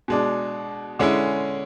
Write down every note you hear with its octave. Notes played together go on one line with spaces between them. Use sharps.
B2 G#3 D4
D3 G#3 C#4 E4